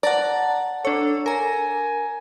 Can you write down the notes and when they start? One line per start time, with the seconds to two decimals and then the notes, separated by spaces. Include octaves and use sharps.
0.03 D5 F#5 A5 A#5
0.85 D4 A4 C#5
1.26 A#4 G#5 A#5